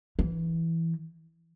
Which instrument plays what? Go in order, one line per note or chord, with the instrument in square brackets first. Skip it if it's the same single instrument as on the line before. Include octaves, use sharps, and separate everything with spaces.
[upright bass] E3